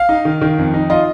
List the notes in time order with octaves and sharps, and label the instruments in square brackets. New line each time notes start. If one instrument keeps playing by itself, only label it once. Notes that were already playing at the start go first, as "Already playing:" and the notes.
Already playing: [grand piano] F5
D#4
D#3
D#3
F2
D#4
F4 D#5